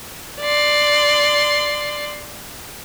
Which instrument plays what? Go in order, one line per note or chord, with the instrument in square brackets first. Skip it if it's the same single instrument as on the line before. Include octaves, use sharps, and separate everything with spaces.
[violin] D5 C6